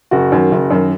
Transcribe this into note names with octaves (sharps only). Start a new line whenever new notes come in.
F#1 F#4
F#2 D#3
F#1
F#2 D#3